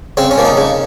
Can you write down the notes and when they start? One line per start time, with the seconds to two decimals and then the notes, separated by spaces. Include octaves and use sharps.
0.17 C#3 C4
0.31 C#4
0.38 F3 A#3
0.45 D#4
0.57 C#3